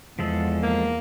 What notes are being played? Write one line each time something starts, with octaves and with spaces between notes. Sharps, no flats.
E2 F3 G#3 A4
A#3